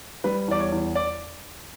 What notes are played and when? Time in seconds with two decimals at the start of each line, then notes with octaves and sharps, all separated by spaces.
0.24 G3 B4
0.48 E2 D5
0.60 C#5
0.72 E2
0.95 D5